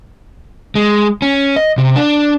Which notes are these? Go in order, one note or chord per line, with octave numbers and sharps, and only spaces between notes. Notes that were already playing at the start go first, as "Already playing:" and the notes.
G#3
C#4
D#5
C3
D4